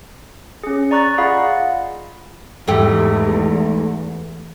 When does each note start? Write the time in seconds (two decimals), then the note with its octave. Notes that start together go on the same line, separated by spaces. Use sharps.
0.64 C#4 G#4
0.91 D5 A#5 C#6 F#6 A6
1.18 F4 G#4 D#5 F5 F#5 B5
2.68 E2 G#2 A3 G4